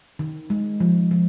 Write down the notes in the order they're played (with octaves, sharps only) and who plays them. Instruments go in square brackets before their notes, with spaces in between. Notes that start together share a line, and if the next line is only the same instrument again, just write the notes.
[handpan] D#3
G#3
F3
F3